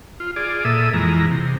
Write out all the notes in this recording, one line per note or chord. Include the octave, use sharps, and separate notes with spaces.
F4
F4 G#4 D5
A#2 A4 E5 D#6
F2 E3 G#3 A#5
C3